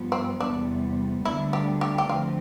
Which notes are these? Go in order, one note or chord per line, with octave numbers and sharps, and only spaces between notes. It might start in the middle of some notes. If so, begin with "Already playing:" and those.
Already playing: G2 F3 B3
C4
E2 C3 G3 B3 D4
D2 D3 G3 B3 D4 E4
G4
G4
G4
D2 D3 F3 C4 F4